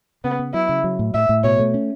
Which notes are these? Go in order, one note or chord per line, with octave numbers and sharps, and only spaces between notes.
C#3 B3
B3
F#3 E4
C#3
F#3
A2
A2 E5
A2
B2 C#5
A3
C#4